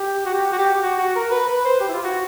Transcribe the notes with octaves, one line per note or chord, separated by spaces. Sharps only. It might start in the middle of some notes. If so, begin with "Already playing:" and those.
Already playing: G4
F#4
G4
F#4
G4
G4
F#4
F#4
A#4
B4
B4
C5
G4
E4
F4
F#4